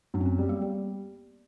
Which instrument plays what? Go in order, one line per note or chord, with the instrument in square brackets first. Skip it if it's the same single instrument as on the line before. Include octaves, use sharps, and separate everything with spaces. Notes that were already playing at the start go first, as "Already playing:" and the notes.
[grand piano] F#2 [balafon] D4
[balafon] C4
B3
[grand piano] G3 [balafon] B3
[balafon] A#3
[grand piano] G3 [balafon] B3